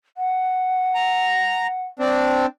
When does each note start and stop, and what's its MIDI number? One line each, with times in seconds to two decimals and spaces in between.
0.17 1.85 78
0.95 1.67 82
2.00 2.46 60
2.00 2.46 62